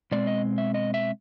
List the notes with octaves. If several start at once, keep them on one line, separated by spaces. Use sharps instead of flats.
B2 G#3 C4 D5
D#5
E5
D#5
E5